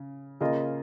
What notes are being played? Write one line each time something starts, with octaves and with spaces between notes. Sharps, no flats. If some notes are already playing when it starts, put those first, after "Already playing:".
Already playing: C#3
C#3 A#3 F4 G#4 D#5